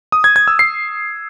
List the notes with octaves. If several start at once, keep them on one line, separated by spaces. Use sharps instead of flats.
D#6
G#6
G#6
E6
C7